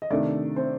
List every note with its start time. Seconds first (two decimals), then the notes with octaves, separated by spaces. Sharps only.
0.02 D#5
0.10 C3 D#3 A3 D4 D5
0.56 C4 C5